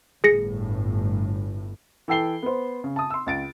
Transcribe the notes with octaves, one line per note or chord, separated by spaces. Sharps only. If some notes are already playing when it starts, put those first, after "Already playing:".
G1 A2 G#4 A#6 C#7
E3 A4 G5 C7 G7
B3 C5
C#3
A5 D#6
C6 E6
C#2 A6 D7